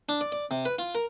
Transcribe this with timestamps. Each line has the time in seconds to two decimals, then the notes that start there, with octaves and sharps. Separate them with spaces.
0.09 D4
0.21 D5
0.32 D5
0.51 C3
0.65 B4
0.79 F4
0.95 A#4